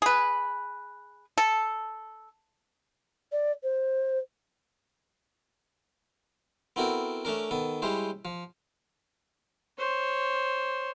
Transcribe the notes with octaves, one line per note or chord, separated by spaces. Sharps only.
G#4 B4
A4
D5
C5
B3 C4 E4 F#4 A4 A#4
A3 C#4 D4 A#4
D#3 B3 A4
G3 G#3 C#4 E4 C5
F3
C5 C#5